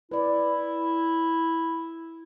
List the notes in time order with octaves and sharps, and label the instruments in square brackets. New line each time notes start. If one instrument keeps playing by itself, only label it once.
[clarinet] E4 [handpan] B4 D5